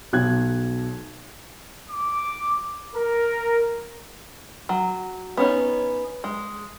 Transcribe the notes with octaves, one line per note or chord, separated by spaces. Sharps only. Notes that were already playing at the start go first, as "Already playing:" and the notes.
B1 F#6 G#6
D6
A#4
F#3
B3 C#4 D#4
G#3